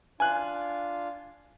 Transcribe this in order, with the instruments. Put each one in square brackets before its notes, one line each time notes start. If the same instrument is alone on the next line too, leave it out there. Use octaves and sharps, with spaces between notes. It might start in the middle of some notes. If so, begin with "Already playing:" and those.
[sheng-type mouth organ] D4 F4 F5 [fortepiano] G#5 F#6